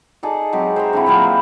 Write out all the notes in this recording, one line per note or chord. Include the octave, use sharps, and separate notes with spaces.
D#4 G#4 A4 D5
F#3 G#3 C4 G4
C5 E5 A#5
D3 C4 E4
A#2 F#3 A#3 C4
B4 G5